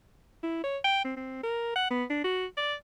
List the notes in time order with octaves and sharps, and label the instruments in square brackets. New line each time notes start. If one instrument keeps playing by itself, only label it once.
[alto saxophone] E4
C#5
G5
C4
C4
A#4
F#5
B3
D4
F#4
D5